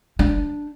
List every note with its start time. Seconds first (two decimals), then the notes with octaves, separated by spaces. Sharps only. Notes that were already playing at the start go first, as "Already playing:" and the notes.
0.19 D4